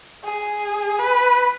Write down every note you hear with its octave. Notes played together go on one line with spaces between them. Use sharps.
G#4
B4